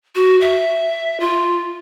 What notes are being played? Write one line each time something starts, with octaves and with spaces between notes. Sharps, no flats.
F#4
E5
F4